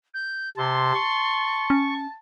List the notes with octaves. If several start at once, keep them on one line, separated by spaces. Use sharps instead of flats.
G6
C3 A5 C6
C#6
C#4